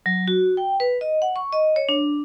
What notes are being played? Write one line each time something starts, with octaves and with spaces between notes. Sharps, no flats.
F#3
F#4
G5
B4
D#5
F#5
C#6
D#5
C#5
D4